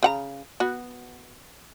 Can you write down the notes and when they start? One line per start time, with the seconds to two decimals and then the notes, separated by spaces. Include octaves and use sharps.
0.03 C#3 F#5 A#5
0.60 B3 F#4